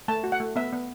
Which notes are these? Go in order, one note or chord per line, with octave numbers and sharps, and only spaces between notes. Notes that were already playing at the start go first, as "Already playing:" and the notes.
A3 A5
F#4
F#5
A3
B3 E5
B3